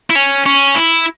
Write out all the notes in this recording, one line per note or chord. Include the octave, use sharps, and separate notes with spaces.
E4
C#4
C#4
E4